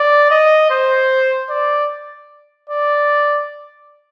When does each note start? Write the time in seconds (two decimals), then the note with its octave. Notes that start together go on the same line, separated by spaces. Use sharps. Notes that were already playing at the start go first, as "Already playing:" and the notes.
Already playing: D5
0.31 D#5
0.70 C5
1.50 D5
2.69 D5